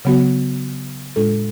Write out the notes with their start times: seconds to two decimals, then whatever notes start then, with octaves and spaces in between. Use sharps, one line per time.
0.05 C#3 F#3 B3 F#4
1.16 A2 G#3 D4 F4 A4